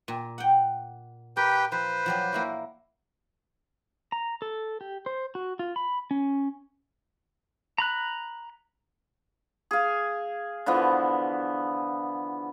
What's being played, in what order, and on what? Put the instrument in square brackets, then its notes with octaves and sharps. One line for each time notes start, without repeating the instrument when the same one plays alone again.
[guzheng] A#2
F#5 G5
[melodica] G4 B4 G5 [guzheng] A#4
[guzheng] F3 [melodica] B4 C5
[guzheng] F3 F#3 D5
A#3 E4 F#4
[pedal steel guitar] A#5
A4
G4
C5
F#4
F4
B5
C#4
A#5 B5 F#6
[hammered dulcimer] G#4 F5
D3 E3 F3 B3